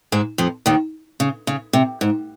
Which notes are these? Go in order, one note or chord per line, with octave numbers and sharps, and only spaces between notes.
G#2 G#3
F2 F3
D#2 D#3
C#3
C#3
C3
G#2